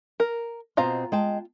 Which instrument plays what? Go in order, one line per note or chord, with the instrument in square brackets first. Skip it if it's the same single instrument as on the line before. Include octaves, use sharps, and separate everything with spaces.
[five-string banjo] A#4
[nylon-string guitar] B2 C4 D#5 [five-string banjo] F4 F5 A#5
[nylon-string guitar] G#3 G5 A5